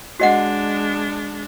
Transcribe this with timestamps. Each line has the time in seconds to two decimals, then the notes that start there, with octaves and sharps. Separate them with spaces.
0.20 G#3 D4 F#4 D#5 F#5